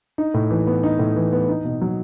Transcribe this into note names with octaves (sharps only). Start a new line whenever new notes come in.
D#4
A2
E3
B3
D#4
A2
E3
B3
D#4
B2
F#3